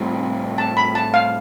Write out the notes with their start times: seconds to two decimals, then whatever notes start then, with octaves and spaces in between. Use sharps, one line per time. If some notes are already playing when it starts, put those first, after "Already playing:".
Already playing: A2 G3 C4 E4
0.58 A5
0.77 B5
0.95 A5
1.14 F5